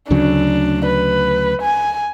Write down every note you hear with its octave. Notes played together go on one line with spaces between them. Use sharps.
D2 C#3 F#3 D4
B4
G#5